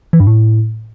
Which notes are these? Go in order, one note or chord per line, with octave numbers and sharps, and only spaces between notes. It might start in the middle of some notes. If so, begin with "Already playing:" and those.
E3
G2
A2